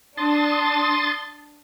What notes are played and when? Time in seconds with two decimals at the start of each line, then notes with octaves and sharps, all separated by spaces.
0.17 D4 C6 D#6 A6